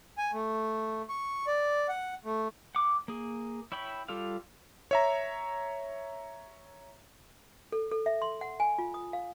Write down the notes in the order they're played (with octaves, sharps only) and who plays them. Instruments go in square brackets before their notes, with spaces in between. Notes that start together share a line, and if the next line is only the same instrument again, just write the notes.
[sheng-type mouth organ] G#5
A3
C#6
D5
F#5
A3
[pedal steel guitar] F#5 D6
A#3 G#4
E4 C#5 G5 B5
G3 F4 A4 D5 F5
[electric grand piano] C#5 E5 A#5
[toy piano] A4
A4
E5
C6
F#5
G#5
F4
D#6
F5